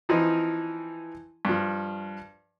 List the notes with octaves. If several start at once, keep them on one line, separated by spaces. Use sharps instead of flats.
E3 F3 C4 D#4
G2 F3